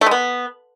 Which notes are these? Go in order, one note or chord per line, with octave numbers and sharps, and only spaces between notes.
A3
G#3
B3